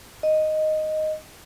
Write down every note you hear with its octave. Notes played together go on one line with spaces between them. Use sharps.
D#5